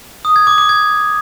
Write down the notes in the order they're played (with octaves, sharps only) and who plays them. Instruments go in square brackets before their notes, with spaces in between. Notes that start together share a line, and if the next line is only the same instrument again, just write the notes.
[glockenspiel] D#6
G#6
D6
D6
G#6